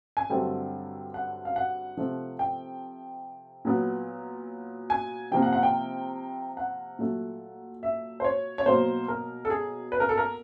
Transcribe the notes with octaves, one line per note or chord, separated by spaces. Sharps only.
G#5
G2 D3 F#3 A3 C4 G5
F#5
F5
F#5
C3 F3 A3
G5
A#2 F#3 B3
G#5
C3 F3 A#3 G5
F#5
F#5
G5
F#5
A#2 F#3 A3
E5
C5
C#5
C#5
B2 F#3 A#3 C5
A#4
A4
G#4
B4
A#4
A4
A#4